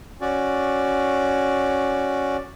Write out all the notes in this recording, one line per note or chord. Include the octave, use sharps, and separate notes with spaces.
C#4 F#4 D5